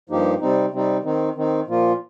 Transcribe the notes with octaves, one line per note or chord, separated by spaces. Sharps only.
G2 F3 A#3 D#4 G4
C3 G3 C4 D#4
C3 G3 C4 D#4
D#3 C4 D#4
D#3 C4 D#4
A#2 F3 A#3 F4